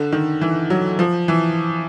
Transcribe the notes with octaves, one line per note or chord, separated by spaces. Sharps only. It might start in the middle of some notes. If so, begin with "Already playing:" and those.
Already playing: D3
D#3
E3
F#3
F3
E3